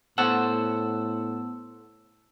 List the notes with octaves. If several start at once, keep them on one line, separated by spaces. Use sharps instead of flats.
A2 B3 A4 C5 F#5 A5 E6